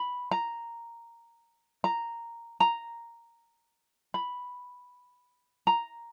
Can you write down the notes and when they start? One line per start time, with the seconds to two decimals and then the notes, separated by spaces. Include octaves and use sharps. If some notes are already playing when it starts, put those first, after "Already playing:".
Already playing: B5
0.31 A#5
1.84 A#5
2.60 A#5
4.14 B5
5.67 A#5